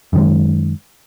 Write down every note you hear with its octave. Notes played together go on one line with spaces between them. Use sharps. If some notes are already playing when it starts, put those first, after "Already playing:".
F#2 D#3 G#3